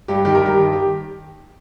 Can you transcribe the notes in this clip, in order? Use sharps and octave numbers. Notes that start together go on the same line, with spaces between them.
G2 G4
D#3 G4
A#4
G2 G4
D#3
G4